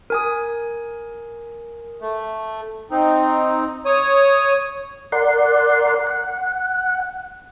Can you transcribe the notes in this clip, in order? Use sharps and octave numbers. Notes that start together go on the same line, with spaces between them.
A#4 G#5 D#6
A3
C4 D#4
C#5 D#6
A#4 D5 F#5 C6
F#5